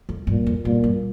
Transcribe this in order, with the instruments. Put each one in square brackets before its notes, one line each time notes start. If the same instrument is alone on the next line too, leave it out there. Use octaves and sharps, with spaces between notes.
[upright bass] F2
[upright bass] G2 [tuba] A#2
[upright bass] F2
[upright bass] G2 [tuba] A#2
[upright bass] G2